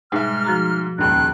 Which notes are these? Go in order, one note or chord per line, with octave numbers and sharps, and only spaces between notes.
G#2 B2 G3 G#3 E5 F6
F3 F#4 A#5
D#1 C#2 F#6